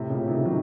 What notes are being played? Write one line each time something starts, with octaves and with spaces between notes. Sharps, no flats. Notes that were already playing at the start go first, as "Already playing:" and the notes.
Already playing: A2 C3
A#2 C#3
C3 D#3
D#3 F#3